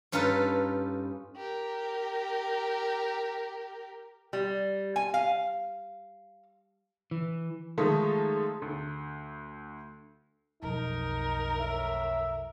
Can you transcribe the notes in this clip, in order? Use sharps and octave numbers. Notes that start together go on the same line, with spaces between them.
G2 C#4 D#4 F4 A4 B4
G4 A#4
G3
G#5
F5
E3
D#3 F3 G#3 A3 D#4 A4
D2
B1 F2 D#4 A#4
A2 E5